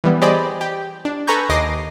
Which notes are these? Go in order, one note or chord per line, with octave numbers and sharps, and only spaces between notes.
E3 G3 B3
G4 G#4 C5 D5 D#5 B5
G4
D4
A4 B4 G#5 A#5 C#6 G6
D#2 D#5 D6 A#6 C7 D#7